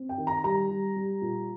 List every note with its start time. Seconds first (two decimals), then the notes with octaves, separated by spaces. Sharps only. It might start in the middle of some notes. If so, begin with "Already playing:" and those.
Already playing: C4
0.09 G5
0.18 D#3
0.27 A#5
0.44 G3 A#5
0.70 G3
0.96 G3
1.22 A#2